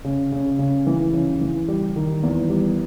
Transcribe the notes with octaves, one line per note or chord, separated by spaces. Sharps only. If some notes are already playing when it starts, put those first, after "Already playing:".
C#3
C#3
C#3
E3
C#3
E3
G3
D#3
E2
G3